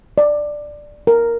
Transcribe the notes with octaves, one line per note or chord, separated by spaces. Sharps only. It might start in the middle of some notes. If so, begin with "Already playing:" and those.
D5
A#4